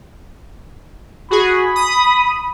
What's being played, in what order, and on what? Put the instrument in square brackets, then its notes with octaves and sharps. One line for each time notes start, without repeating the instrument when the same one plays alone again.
[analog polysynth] F#4 G#4 [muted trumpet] B5
[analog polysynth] D#6